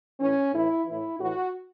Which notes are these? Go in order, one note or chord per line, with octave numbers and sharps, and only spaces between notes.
A2 E3 C#4
A2 E3 E4
A2 E3 E4
A2 E3 F#4